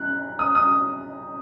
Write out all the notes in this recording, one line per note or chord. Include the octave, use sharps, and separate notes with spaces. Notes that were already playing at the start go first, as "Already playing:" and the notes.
Already playing: F#6
D#6
D#6